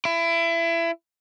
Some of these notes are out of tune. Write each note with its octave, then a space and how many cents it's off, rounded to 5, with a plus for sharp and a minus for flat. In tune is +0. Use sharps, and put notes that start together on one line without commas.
E4 +25